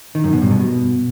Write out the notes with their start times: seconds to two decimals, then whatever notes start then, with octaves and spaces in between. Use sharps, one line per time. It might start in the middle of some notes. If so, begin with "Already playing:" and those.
0.15 D#3
0.24 F#2
0.33 B2
0.42 G2
0.51 B2